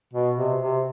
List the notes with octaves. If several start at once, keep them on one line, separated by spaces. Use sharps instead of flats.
B2
C3
C3